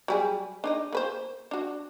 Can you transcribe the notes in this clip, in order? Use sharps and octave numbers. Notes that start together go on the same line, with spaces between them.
F#3 G3 G#4
D4 D#4 D#5
A#3 B4 C5
D4 F#4